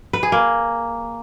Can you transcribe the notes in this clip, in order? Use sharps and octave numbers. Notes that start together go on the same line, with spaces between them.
B4
G#4
A#3